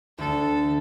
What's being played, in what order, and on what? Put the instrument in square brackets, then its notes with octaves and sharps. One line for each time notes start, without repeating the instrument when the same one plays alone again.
[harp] D2 [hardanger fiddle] A4